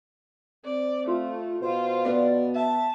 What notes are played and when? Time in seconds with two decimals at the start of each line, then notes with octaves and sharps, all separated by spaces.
0.65 C4 D5
1.07 A3 F4
1.62 B2 F4 C5
2.05 B3 D5
2.55 E5 A5